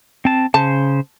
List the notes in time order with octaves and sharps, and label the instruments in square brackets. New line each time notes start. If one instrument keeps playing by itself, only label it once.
[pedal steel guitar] C4 A5
[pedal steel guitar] C#3 C5 [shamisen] A5